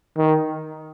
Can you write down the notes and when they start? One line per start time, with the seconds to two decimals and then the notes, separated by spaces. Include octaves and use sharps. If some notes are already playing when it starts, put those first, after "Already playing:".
0.17 D#3